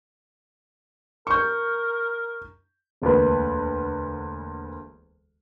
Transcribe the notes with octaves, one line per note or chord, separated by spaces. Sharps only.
A#4 C#6 G6
E1 D2 A#3 B4